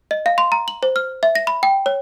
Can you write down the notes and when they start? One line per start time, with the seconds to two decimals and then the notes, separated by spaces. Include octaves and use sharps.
0.11 D#5
0.26 F5
0.38 C6
0.52 A#5
0.68 F#7
0.83 C5
0.96 F6
1.23 E5
1.35 A#6
1.47 B5
1.63 G5
1.86 C#5